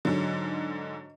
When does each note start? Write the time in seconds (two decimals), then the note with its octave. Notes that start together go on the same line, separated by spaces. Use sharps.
0.05 G#2 D3 F#3